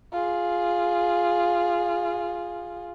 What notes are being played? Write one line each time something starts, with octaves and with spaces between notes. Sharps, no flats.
F4 G#4